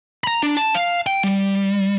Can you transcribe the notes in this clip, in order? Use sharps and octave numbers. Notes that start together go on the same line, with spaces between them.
A#5 B5
D4
A5
F5
G5
G3